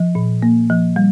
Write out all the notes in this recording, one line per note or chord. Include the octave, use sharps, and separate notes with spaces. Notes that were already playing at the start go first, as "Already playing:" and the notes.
Already playing: F3
A#2
A#3
F3
G3